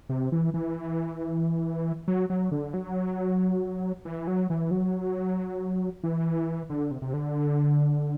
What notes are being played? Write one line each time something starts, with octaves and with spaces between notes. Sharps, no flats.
C3
E3
E3
F#3
F#3
D3
F#3
E3
F#3
E3
F#3
E3
D3
C3
C3
D3